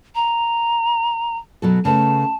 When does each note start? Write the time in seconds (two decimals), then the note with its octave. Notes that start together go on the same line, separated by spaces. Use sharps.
0.15 A#5
1.62 B2 F#3 A4
1.85 C#3 A3 B4 A5